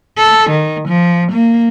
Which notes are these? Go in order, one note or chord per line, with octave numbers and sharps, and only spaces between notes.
A4
D#3
F3
A#3